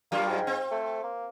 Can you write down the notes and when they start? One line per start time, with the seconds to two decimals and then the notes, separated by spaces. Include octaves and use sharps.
0.12 G2 F#3 A#3 F4
0.29 G#2
0.47 C4
0.71 A3
1.04 A#3